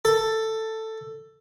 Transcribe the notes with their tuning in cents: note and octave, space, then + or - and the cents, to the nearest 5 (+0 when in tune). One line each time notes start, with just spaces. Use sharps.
A4 +10